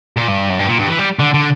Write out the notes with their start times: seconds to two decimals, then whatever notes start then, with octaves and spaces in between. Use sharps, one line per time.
0.17 A#2
0.28 G2
0.50 F#2
0.59 G2
0.68 A#2
0.79 G2
0.88 E3
0.99 G3
1.19 D3
1.34 D3